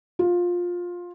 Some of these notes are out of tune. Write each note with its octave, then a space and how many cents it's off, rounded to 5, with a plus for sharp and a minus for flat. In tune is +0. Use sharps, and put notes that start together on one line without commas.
F4 +15